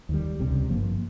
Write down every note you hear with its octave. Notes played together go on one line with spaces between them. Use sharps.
D#2 D#3 G3
C#2 C3 G3
G#1 G2 F3 A#3